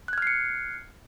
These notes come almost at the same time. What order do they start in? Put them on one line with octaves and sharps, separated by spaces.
F#6 G#6 F6 C7 C#7